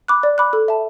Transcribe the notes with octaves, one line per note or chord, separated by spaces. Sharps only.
B5 D6 F#6
D5
B5 D6 F#6
A4
E5 A5